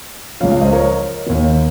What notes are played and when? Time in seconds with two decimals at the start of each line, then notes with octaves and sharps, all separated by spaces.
0.40 C#2 C#3 F3 C#5 F5
0.51 C#5 F5
0.62 C5 D#5
0.73 A#4 C#5
1.26 D#2 D#3